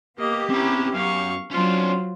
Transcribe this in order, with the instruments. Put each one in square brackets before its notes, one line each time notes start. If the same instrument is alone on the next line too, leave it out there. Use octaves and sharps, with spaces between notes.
[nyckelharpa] A#3 D#5 [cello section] B3 G4
[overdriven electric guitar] C4 A#5 [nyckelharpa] C#4 E4
[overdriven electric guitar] F#2 [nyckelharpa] F5 C#6
[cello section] F#3 [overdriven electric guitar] C#4 D4 [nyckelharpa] F4 C5